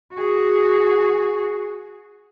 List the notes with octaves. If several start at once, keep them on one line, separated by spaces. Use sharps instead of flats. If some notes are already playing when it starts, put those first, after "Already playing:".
F#4 G#4